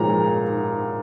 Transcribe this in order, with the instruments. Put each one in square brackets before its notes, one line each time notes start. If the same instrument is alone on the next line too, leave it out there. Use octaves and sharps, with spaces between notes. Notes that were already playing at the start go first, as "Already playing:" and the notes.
Already playing: [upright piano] A#2 F3 G#3 A#5